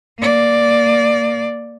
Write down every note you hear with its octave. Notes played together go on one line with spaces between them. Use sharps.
A#3 D5